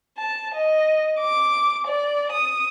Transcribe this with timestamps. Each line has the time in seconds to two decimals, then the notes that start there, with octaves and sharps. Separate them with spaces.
0.18 A5
0.54 D#5
1.21 D6
1.87 D5
2.33 D#6